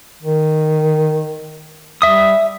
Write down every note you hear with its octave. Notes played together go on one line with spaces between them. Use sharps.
D#3
G3 E5 D#6